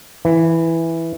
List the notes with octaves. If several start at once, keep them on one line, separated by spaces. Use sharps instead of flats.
E3